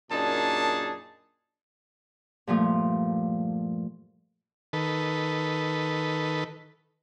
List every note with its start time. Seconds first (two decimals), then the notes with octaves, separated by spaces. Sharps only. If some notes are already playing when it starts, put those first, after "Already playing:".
0.11 F#2 A#2 D4 D#4 G#4 A5
2.47 G2 A#2 F3 A3
4.73 D#3 A4 B4